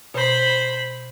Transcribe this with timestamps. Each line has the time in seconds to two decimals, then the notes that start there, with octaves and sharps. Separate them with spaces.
0.14 B2 C5 C#5 B5